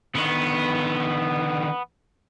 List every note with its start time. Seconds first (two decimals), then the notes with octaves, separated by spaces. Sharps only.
0.15 D3 D#3 B3